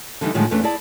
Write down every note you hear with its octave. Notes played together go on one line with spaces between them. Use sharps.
D3 E3 G3 D#4
A2 D3 D#3 F3 G3 G#3
E2 E3 A3 C#4 D4
E4 G#4 D5 A5